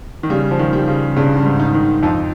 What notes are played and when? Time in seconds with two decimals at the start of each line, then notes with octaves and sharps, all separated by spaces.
0.23 D#3
0.30 C#3 G3
0.51 F3
0.59 D#3
0.73 G3
0.88 C#3
1.16 G2 C#3
1.36 G2
1.45 G#2
1.59 D#4
1.74 D#3
2.03 F2 D#4